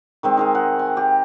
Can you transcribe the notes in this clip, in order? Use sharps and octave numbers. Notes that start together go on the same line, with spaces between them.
D#3 G#3 C4
D#4 G#4 A#4
F#5
G#5
G4